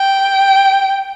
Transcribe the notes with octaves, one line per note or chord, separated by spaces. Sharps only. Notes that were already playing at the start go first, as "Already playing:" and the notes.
Already playing: G5